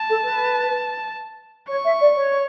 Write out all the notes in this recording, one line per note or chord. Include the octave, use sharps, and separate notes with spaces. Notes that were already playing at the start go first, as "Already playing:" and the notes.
Already playing: A5
A4
B4
C#5 C#6
E5
D5
C#5